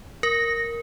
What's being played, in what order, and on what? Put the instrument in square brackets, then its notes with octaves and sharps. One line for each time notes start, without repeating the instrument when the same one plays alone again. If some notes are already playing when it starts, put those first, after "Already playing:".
[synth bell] A#4 [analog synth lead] A#6